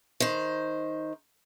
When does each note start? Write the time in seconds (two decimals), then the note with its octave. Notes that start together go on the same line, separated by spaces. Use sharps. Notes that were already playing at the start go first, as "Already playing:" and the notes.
0.20 D#3 C5